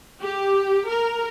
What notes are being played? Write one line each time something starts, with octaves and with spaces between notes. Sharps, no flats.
G4
A#4